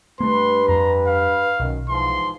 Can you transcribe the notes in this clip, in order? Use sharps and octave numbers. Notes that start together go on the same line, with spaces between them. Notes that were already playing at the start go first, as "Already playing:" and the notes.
G2 A3 A#3 B4 C6
F2 A#5
F5
B1 F#2 D#3
G#2 E3 F3 C6